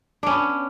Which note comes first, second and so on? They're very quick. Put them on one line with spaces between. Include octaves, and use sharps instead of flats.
D4 C#4 B3